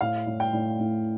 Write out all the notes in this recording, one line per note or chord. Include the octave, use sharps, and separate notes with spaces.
A2 F5
A2
G5
A2
A2